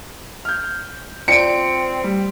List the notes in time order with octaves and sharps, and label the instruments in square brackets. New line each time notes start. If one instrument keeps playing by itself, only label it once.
[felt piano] F6 G6
[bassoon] C4 [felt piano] F4 D5 [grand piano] C#7 D7
[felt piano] G3